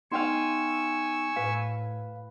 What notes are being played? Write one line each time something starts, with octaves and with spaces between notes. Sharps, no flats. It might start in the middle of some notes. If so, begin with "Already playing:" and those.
B3 D#4 F5 G5 G#5 C6 C#6 E6
A2 B4 F5